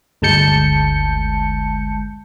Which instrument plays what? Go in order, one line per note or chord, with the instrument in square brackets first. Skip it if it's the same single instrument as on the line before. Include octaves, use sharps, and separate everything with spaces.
[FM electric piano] G1 D2 G#3 A5 G6 C#7